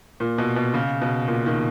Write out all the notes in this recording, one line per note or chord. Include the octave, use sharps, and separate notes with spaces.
A#2
B2
B2
C#3
B2
A#2
D#3